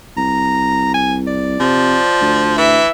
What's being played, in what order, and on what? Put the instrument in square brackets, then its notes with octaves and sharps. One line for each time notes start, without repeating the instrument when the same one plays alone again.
[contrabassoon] C2 [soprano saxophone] A#5
[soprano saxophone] G#5
D5
[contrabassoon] C3 [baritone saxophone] F3
[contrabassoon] D2
[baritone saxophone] E3 [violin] E5